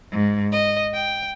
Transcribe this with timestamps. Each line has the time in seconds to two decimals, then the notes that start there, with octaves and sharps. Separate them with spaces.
0.11 G#2
0.52 D#5
0.94 G5